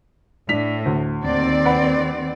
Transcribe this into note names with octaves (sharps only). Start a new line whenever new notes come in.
A2 D4 B6 F7
D2
D#2 C4 D5
B4 F#5 B5